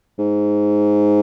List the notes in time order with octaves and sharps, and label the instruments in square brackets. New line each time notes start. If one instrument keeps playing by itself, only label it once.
[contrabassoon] G#2